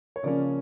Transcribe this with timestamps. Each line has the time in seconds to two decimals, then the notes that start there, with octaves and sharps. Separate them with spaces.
0.16 C#5
0.23 C#3 F3 A#3 C#4 D5